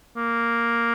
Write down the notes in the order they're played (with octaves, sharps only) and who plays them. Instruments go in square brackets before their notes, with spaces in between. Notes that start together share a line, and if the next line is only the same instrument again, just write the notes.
[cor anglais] A#3